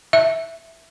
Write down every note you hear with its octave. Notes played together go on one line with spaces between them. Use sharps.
E5